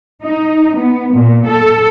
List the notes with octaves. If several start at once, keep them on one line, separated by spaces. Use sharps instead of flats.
D#4
B3
A#2
A4